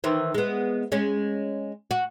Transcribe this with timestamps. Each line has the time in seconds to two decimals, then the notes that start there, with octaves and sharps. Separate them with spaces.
0.04 D#3 E3 C5
0.34 G#3 B3
0.92 G#3 C#4
1.91 F#4